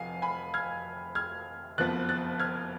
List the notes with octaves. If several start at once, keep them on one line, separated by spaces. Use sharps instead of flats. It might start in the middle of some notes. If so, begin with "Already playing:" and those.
Already playing: F1 F2 F3 F5 F#5 G#5
G#5 B5
F6 G#6
F6 G#6
F#1 F2 F3 B3 F#6 A6
F#6 A6
F6 G#6